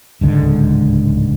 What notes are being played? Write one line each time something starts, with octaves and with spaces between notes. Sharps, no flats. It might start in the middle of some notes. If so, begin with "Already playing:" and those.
D1 C#2 G#2 D3